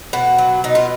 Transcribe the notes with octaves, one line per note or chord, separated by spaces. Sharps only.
B2 F#4
F#3
B2 D#4
F4